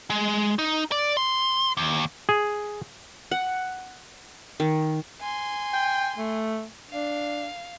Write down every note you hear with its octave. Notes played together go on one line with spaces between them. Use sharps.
G#3
D#4
D5
C6
D#2
G#4
F#5
D#3
G#5 C6
G5
A3
D4 F5